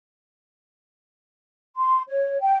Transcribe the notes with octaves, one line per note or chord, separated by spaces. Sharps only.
C6
C#5
G5